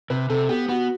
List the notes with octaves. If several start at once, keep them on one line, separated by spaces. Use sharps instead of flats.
C3 B4
C3 A4
B3 G4
B3 F#4